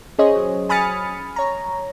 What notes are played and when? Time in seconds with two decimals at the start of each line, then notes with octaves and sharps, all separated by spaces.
0.19 C#4 G#4 C5 C#5 D#5
0.36 F#3
0.69 G#5 B5 D#6 F6 A6 C#7
1.36 C#5 A#5